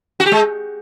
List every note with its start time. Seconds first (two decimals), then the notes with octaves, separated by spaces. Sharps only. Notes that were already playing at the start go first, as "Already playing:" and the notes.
0.20 F#4
0.26 G4
0.32 G#3